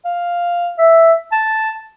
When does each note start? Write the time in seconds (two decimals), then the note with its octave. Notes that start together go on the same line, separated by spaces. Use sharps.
0.05 F5
0.78 E5
1.32 A5